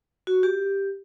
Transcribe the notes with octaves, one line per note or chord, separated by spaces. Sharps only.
F#4
G4